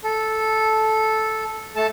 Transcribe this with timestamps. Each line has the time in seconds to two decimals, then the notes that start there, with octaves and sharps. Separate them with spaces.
0.04 A4
1.76 A3 A4 A5